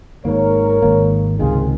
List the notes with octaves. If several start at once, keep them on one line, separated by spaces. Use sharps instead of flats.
G#1 G#2 D#3 A#3 A#4 C#5
G#1 G#2 D#3 A#3
C#2 C3 D#3 F4 G#4